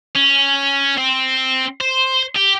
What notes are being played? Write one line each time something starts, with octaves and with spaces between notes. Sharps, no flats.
C#4
C4
C5
G4